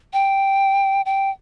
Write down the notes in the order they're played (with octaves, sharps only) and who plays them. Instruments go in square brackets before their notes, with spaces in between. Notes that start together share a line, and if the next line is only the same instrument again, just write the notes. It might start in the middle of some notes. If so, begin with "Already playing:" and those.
[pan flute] G5
G5